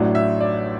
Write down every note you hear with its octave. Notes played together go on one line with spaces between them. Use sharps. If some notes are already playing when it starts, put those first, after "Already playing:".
Already playing: A1 A2 F#3 D4
E5
D5